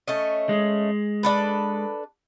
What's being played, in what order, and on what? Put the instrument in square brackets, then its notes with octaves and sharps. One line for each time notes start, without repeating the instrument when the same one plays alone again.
[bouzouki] A3 C#4 D#5
[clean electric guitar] G#3
[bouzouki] D4 A4 B4